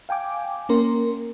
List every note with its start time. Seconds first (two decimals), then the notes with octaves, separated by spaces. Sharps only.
0.09 F5 G5 G#5 D6
0.69 A#3 C#4 A#4 C6